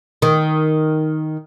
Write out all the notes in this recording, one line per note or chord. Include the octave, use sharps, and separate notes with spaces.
D#3